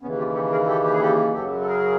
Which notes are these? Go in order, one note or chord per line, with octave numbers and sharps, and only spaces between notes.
D#2 C#3 E3 B3 C#4
F4 G4
G4 A4
G#4 A#4
G4 A4
G4
G#4
G4 A4
F#2 C#3 F#3 G4 A4
A4
G#4 A#4